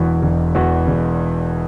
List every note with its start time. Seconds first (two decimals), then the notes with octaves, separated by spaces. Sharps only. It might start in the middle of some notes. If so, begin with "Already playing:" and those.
Already playing: E1 E2 E3 B3 F#4
0.22 E1
0.55 E2 E3 B3 F#4
0.87 E1